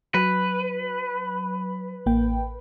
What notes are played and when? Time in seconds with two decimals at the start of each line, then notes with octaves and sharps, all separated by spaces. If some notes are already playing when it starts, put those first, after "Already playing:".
0.14 F#3 B4
2.06 A1 A#3 G5